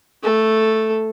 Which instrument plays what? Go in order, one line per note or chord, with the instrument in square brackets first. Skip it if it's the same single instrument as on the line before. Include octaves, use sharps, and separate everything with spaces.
[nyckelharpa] A3 A4